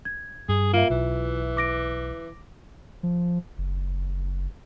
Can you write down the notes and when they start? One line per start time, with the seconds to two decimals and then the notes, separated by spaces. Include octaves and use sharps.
0.05 G#6
0.49 G2 G#4
0.73 A#3 F4 E5
0.90 B1 E3
1.57 D6 A#6 D7
3.03 F3
3.58 F#1